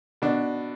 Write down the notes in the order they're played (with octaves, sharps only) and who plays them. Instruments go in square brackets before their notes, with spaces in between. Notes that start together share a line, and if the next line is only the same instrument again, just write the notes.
[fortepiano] B2 D4